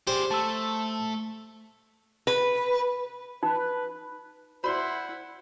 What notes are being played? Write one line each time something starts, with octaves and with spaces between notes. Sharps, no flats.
G4 G#4 C5 D5
A3 A5 E6
B4
D#4 B4
E4 F#4 C5 D5 F#5 B5 C6